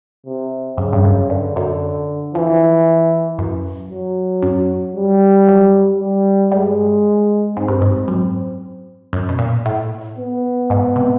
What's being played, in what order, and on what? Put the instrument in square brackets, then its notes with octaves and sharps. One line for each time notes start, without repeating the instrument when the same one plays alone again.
[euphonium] C3
[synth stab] F#2 [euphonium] C#3
[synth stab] G2
F#2
[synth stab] G2 [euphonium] D3
[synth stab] F#2
[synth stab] F2 [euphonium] E3
[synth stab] F#2
[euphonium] F#3
[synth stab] F#2
[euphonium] G3
[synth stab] F#2
[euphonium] G3
[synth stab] G2 [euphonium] G#3
[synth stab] G#2 [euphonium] C4
[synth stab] G2
G#2
F#2
F#2
B2
A#2
A2
[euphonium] B3
[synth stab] G#2
C3